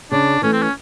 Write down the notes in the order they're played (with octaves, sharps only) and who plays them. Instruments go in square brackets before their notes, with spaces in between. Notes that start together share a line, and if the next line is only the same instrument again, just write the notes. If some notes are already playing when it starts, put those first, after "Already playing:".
[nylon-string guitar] C#3 [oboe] D4
[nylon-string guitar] E3 A3 [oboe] C#4
[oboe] C4
C#4